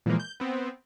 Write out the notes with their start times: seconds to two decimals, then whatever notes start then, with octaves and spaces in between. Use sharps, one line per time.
0.06 A#2 E3 F3 G#3 A#3
0.20 G6
0.40 B3 C4